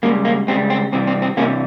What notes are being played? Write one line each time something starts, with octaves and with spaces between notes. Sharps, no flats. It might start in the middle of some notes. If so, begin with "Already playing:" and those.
C#2 C#3 G3 A#3
A#3
C#2 C#3 G3 C4
C4
C2 C3 E3 G3 C4
C4
C4
C2 C3 E3 G3 A#3 C#4